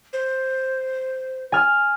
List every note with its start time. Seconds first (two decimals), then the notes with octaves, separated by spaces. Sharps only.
0.13 C5
1.52 G#5 F6